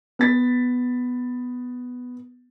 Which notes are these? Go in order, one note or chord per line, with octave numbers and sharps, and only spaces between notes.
B3 A6 B6